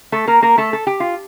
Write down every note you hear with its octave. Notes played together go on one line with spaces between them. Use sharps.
A3 A4
A#3 A#4
A#3 A#4
A3 A4
A4
G4
F4